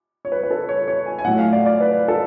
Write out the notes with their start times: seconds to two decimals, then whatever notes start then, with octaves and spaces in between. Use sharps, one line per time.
0.25 C#5
0.32 B4
0.43 B4
0.51 A4
0.69 C#5
0.88 C#5
1.06 G#5
1.18 G#5
1.24 A2 F#3 A3 F#5
1.39 F5
1.53 D5
1.66 D5
1.81 B4
2.08 A4